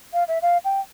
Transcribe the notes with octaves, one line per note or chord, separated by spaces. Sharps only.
F5
E5
F5
G5